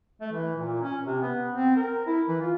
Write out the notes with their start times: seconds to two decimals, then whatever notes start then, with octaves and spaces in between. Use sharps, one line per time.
0.21 A3
0.32 E3
0.56 A#2
0.82 C#4
1.06 C3
1.22 B3
1.54 C4
1.76 A#4
2.07 E4
2.28 E3
2.41 F4